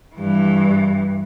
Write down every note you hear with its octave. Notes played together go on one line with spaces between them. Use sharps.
G2 E3